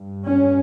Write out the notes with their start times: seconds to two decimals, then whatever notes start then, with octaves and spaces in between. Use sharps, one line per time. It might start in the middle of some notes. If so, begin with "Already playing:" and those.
Already playing: G2
0.24 C#4